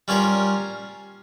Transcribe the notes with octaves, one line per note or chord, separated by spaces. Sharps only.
G3 C#4 F4 A#4 C#5